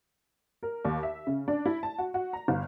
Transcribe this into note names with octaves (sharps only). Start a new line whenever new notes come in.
A#4
D#2
E5
C#3
D4
E4
A5
F#4
F#4
A#5
G1